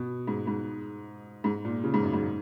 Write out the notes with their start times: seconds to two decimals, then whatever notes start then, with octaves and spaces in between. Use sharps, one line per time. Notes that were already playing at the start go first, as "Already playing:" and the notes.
Already playing: B2
0.27 G#2
0.47 G#2
1.44 G#2
1.65 A#2
1.83 C#3
1.94 G#2
2.03 F#2
2.13 G#2